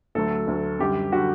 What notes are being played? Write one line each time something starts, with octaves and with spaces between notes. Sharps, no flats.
D2 D3 F#3 A3 A4
D2 D3 F#3 A3
F#2 D3 G3 G4
D3 G3 F#4